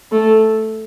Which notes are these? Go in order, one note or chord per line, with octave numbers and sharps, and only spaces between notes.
A3